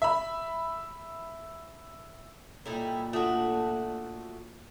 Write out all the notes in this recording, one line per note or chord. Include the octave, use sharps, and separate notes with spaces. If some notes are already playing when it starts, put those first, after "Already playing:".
E5 B5
A#2 G3 D#4 E4 A4
A3 D4 F4 F#4 D#6